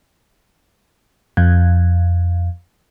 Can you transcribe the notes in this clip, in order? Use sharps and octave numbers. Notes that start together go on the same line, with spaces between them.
F2